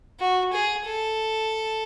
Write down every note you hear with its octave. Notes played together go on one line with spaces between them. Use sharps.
F#4
G#4
A4